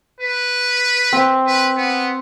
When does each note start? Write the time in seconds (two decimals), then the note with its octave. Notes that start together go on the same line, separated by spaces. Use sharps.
0.20 B4
1.13 C4
1.47 B4
1.77 B3